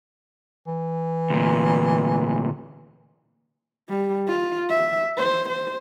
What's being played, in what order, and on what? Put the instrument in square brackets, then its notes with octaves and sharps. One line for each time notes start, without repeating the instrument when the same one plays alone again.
[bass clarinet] E3
[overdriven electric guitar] D2 A#2
[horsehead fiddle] G3
F4
E5
C5
C5